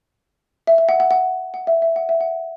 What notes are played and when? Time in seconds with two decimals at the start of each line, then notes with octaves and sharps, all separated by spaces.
0.67 E5
0.78 E5
0.89 F#5
1.00 F#5
1.11 F#5
1.54 F#5
1.67 E5
1.82 E5
1.96 F#5
2.09 E5
2.21 F#5